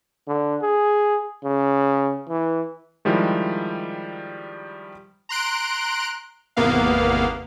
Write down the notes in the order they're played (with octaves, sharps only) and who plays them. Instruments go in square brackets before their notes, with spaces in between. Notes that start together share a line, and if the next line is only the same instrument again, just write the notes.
[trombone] D3
G#4
C#3
E3
[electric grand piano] D#3 F3 G3 G#3 D#4 E4
[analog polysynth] A#5 C6 F#6 D7
G#1 E2 C3 A#3 B3 F5